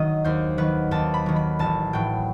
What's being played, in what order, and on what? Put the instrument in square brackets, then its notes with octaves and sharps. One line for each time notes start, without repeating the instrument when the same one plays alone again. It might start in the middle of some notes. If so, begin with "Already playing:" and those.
Already playing: [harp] D#3 F#3 D#5
D#2 C5
D#3 F#3 B4
D#2 A5
B5
D#3 F#3
B5
A1 A5
A2 F#3 G5